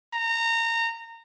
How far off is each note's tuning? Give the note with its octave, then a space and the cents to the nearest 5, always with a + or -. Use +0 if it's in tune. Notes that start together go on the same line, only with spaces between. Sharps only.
A#5 -25